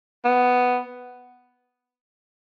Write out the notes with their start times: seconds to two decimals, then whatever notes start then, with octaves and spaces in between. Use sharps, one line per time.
0.24 B3